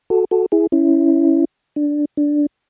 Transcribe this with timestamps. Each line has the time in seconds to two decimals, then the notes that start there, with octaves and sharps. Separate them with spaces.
0.10 F#4 A4
0.31 F#4 A4
0.52 E4 G#4
0.72 C#4 E4
1.76 D4
2.17 D4